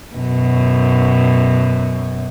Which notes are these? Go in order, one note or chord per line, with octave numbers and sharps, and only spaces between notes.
F#2 B2